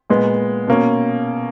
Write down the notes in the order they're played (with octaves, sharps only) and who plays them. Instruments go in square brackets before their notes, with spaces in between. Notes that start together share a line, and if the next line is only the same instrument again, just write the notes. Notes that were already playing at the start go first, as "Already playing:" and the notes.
[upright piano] A#2 G#3 B3
B2 A#3 C#4